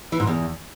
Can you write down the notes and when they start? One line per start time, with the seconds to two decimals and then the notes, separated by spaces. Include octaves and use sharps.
0.12 E3
0.20 G#2
0.27 E2